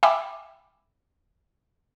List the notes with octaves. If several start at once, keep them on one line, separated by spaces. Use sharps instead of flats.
E5 G5 G#5 B5 D6 E6